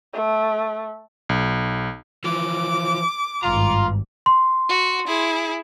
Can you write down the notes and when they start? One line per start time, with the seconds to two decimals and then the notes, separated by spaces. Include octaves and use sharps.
0.14 A3
1.29 B1
2.24 E3 F3 D6
3.43 G#1 G2 F4 A#5 C6
4.26 C6
4.68 F#4
5.07 E4 G#4